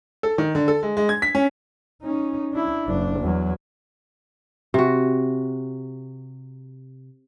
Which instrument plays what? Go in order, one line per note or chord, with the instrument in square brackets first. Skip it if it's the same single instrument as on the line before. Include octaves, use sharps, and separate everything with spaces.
[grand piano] A4
D#3
D3
A4
G#3
G#3
G#6
B6
C#4
[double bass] C#4 D#4
D4 E4
F#1 D4
E2 F#3
[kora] C3 F#4